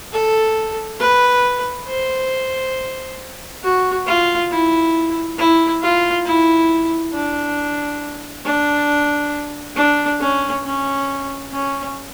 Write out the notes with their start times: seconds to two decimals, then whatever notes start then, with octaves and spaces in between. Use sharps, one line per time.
0.13 A4
1.00 B4
1.88 C5
3.63 F#4
4.07 F4
4.51 E4
5.38 E4
5.82 F4
6.26 E4
7.14 D4
8.45 D4
9.77 D4
10.20 C#4
10.64 C#4
11.53 C#4